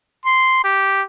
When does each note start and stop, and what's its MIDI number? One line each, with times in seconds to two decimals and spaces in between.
0.26 0.62 84
0.64 1.02 67